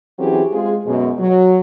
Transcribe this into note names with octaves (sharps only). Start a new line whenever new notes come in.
E3 F#3 C4 C#4 G4 G#4
G#3 C4 F4 G#4
F#2 B2 G#3
F#3